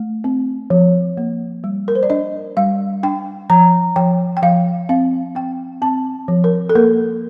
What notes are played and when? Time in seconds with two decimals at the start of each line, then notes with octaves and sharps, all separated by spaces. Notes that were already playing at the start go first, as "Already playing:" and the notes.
Already playing: A3
0.24 C4
0.70 F3
1.17 A#3
1.64 G3
1.88 A#4
1.95 C5
2.03 D5
2.10 D4 D#5
2.57 G3 F5
3.03 D4 G5
3.50 F3 A#5
3.96 F3 G5
4.37 G5
4.42 F3 F5
4.89 C4 F5
5.35 C4 G5
5.82 C4 A5
6.28 F3
6.44 A#4
6.69 A4
6.75 A#3 A#4